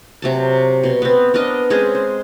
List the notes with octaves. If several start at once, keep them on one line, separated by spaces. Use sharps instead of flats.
C3 F#3 A5
B2 C6
B3 C4
B3 D4 A#4 D#5
G#3 C4 C#4 G#4
C5